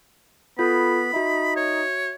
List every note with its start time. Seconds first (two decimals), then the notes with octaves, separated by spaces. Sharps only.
0.59 B3 F4 A4 B5
1.14 D#4 F#4 E5
1.56 C#5